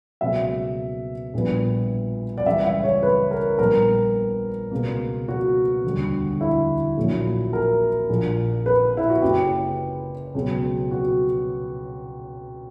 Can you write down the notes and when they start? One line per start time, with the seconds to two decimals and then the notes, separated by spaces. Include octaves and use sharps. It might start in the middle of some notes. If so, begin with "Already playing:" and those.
0.21 C#2 B2 F#3 A#3 E5
1.34 A#1 A#2 G3 B3
2.38 D5
2.46 C#2 C#3 E3 G3 E5
2.65 E5
2.84 C#5
3.03 B4
3.31 A#4
3.58 A#1 A#2 G3 B3 A#4
4.71 C#2 B2 A#3
5.28 F#4
5.84 E1 D2 D3 G3
6.41 E4
6.97 A#1 A#2 F#3 A#3
7.53 A#4
8.09 A#1 A#2 A#3
8.66 B4
8.97 E4
9.10 F#4
9.22 F#1 F#2 C#3 G4
10.35 C#2 B2 F#3 B3
10.91 F#4